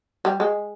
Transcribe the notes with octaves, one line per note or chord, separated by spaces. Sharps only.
G3
G#3